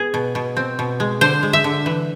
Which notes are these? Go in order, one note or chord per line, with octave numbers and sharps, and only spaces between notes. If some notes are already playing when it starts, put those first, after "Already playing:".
Already playing: B3 G#4
B2
B2
C4
B2
G#3
D3 C5
G#3
E5
D3
E3